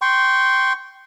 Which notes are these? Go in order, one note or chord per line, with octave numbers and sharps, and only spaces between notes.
G5 C6 C#6